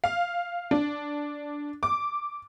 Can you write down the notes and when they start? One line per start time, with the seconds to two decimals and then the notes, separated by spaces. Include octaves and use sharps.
0.04 F5
0.71 D4
1.83 D6